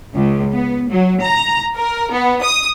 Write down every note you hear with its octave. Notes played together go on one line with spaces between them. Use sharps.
C#2
B3
F#3
A#5
A#4
B3
D#6